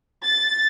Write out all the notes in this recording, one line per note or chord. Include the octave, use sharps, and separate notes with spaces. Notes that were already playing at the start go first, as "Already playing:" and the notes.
A6